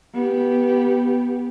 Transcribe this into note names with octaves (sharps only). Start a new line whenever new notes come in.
B3 G4